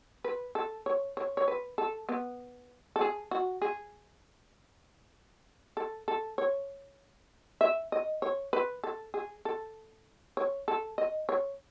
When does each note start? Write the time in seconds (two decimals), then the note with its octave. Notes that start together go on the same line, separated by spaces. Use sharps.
0.24 B4
0.55 A4
0.86 C#5
1.17 C#5
1.37 C#5
1.48 B4
1.78 A4
2.09 B3
2.96 A4
3.01 G#4
3.31 F#4
3.62 G#4
5.77 A4
6.08 A4
6.38 C#5
7.61 E5
7.92 D#5
8.22 C#5
8.53 B4
8.84 A4
9.14 G#4
9.45 A4
10.37 C#5
10.68 A4
10.98 D#5
11.29 C#5